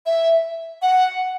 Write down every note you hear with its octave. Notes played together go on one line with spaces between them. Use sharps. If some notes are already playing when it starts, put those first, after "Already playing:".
E5
F#5